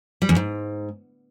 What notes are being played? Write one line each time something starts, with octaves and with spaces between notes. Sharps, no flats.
G3
E2
G#2